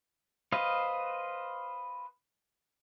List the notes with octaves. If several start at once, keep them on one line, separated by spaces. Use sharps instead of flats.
B4 C5 D#5 F5